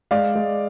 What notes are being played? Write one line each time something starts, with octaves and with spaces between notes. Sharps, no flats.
G#3 D5 F5
G#3